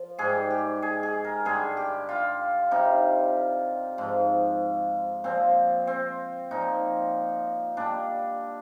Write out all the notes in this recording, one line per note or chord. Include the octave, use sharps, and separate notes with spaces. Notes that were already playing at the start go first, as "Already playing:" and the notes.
Already playing: F3
G#2 G3 G#4
G4
G#4
G#4
A#4
G2 D3 G3 G#4
G4
F4
C3 G3 D#4
G#2 F3
A#2 F3 C4
C4
A#2 F3 D#4
A#2 G3 D4